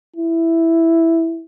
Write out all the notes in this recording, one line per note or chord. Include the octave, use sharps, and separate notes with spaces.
E4